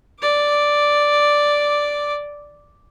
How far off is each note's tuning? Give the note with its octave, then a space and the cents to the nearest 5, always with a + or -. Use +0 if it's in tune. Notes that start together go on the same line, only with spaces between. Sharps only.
D5 +0 D6 +0